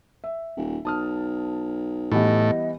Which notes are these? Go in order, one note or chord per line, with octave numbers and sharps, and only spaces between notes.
E5
D#1
B1 A5 D#6 F6
A2 E3 G3 B3 D#5